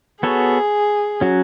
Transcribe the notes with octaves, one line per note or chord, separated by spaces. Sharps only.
B3 F#4 G#4 A4 C#5
F#3 C#4 F#4